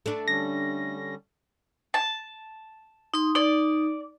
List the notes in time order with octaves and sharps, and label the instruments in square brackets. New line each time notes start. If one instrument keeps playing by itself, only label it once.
[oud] A3 D4
[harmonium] D3 G3 C#4 [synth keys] A#6
[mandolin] A5
[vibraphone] D#4 C6 D#6
[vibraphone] D#4 [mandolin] D5